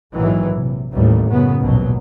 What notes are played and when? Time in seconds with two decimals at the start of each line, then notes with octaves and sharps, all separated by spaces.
0.16 A#1 G#2 D#3 E3 F#3 G#3
0.56 C3
0.93 A1 D#2 A2 G3
1.30 F#2 C#3 B3
1.63 A#1 D#2 G#2 B2 F#3